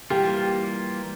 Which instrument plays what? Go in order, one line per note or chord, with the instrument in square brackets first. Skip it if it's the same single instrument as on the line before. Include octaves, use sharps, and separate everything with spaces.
[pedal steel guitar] E3 G3 A#3 F4 [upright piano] G4